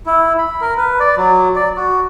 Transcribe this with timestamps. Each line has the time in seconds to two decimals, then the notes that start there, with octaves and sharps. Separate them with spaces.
0.06 E4
0.38 B5
0.61 A#4
0.77 B4
1.00 D5
1.17 F#3
1.56 D5
1.77 F#4